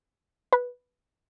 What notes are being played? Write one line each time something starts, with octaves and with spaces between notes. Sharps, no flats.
B4